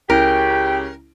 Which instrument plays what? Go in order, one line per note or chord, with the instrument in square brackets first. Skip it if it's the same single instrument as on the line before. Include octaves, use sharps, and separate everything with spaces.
[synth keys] C#2 C#4 E4 [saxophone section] C#3 G4 [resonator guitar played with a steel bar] A#4 [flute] G5